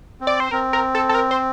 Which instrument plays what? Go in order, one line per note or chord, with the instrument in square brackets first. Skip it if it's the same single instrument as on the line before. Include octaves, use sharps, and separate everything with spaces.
[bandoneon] C4
[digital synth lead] D5
C5
[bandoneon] C4 [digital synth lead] A#4
[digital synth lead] A#4
A4
A4
A#4
C5